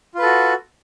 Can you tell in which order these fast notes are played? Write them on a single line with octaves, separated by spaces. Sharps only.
F4 B4 A4 F#4